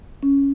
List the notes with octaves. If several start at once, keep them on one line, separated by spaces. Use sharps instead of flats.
C#4